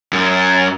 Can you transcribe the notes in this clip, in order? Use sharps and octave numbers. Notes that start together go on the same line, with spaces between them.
F#2